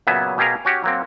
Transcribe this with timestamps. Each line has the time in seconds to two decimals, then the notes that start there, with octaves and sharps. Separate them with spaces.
0.07 A#2 C#3 F#3 B3 E5 G#5
0.38 B2 G4 G#4 A#4 F5 A#5
0.65 C#4 F#4 G4
0.84 F#3 A#3 C4